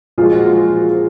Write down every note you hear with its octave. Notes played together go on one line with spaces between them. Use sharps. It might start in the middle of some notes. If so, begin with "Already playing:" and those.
A#2 F3 G#3 F4 G#4
F#4
F4
F#4